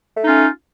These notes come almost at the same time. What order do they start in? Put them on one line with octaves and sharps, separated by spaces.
A3 D#4 F4 C#4